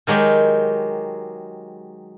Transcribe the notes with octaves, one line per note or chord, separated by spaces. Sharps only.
D#3 F#3 G#3 G4